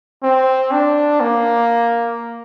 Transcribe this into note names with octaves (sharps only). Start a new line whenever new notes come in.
C4
D4
A#3